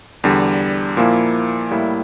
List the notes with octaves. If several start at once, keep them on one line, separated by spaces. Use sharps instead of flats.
E2 D3 G3
A#2 F3 A#3 E4
A2 G3 A#3 E4